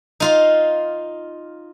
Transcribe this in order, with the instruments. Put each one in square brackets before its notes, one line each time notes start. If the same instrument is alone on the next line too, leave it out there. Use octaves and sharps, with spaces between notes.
[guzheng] D#4 F4 F5